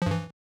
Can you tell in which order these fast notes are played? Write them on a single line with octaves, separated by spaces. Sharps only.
F3 G2 E3